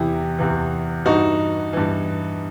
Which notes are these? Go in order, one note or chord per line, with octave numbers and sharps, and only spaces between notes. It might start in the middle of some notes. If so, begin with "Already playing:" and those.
Already playing: E2 C3 E3 E4 G4
E2 C3 E3
G2 E3 D#4 F#4
G2 E3